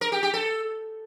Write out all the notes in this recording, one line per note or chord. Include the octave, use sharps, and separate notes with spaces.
A#4
G4
G4
A4